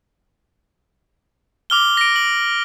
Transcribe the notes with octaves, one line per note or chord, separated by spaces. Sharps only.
D6 F6 G7
A#6 D7
F#7